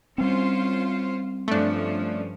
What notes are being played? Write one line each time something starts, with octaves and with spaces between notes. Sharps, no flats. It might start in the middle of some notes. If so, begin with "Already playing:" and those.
G3 C4 C#4 F4 C5
G2 F3 A3 C#4 D4